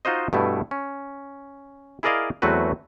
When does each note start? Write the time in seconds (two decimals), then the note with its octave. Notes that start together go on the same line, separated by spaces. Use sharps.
0.05 D#4 F4 F#4 C5 D#5
0.33 G2 B2 A3 E4
0.71 C#4
2.03 E4 G#4 A#4 D5 D#5 F5
2.42 E2 F#3 A3 C4 F#4 B4